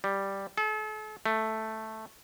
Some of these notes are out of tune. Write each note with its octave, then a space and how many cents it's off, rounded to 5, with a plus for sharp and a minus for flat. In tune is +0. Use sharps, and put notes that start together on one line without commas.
G3 +0
A4 -40
A3 +0